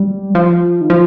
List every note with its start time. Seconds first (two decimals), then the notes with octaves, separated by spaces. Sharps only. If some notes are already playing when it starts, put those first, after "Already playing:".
Already playing: G3
0.35 F3
0.81 D#3
0.90 F3